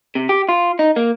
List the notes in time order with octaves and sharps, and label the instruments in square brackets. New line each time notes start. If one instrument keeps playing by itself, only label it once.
[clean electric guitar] C3
G4
F4
D#4
A#3